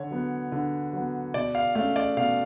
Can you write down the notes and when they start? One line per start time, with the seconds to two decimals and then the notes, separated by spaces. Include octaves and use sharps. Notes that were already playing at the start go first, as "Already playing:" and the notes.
Already playing: D3 C#5
0.11 F#3 B3
0.52 D3
0.93 F#3 B3
1.34 B2 D5
1.55 F5
1.75 A3 C#4 F5
1.96 D5
2.17 B2 F5